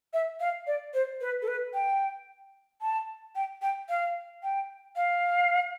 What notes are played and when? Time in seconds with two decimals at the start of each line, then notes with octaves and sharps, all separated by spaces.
0.13 E5
0.40 F5
0.67 D5
0.94 C5
1.21 B4
1.42 A4
1.48 B4
1.74 G5
2.81 A5
3.35 G5
3.62 G5
3.89 F5
4.43 G5
4.96 F5